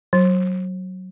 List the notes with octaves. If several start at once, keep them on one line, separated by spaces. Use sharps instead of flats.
F#3